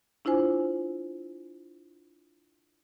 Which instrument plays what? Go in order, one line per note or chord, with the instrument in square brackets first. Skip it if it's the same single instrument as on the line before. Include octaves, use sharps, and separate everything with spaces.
[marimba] D4 E4 F4 C5 G#5